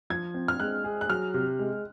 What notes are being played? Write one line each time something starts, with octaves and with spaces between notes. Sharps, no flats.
F3 G#6
C4
F6
G#3 F#6
G#4
F#6
F#3 F6
C3
G#3